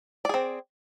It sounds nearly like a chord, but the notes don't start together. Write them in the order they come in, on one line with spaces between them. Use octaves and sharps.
D5 G#4 C4